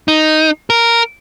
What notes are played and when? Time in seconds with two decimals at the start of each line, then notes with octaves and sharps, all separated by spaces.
0.08 D#4
0.70 A#4